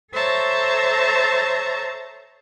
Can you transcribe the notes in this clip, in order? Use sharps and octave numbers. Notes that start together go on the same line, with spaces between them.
A4 C5 C#5 E5 A5 A#5